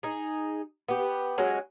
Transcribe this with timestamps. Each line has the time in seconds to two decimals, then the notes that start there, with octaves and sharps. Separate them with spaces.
0.03 D#4 G#4
0.89 B3 G4
1.38 F#3 G#3 C#4